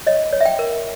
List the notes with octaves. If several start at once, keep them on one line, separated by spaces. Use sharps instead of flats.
C#5 D#5
C#5
E5
G5
A#4